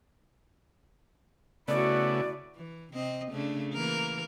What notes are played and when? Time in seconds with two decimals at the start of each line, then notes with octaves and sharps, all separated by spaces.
1.68 C#3 A3 B3 E4 F#4 D5
2.56 E3
2.94 C3 C4 D#5
3.30 C#3 A3 D4
3.73 E3 A#3 A#4